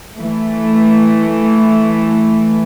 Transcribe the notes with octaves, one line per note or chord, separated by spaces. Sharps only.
E3 A3